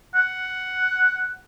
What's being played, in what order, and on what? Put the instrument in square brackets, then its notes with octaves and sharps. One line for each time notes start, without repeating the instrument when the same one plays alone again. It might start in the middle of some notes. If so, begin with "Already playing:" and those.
[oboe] F#5